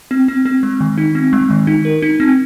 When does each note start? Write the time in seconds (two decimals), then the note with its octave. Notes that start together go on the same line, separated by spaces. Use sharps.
0.11 C4
0.28 C4
0.45 C4
0.63 G#3
0.81 D#3
0.98 D#4
1.15 C4
1.33 G#3
1.50 D#3
1.67 D#4
1.85 A#4
2.02 D#4
2.20 C4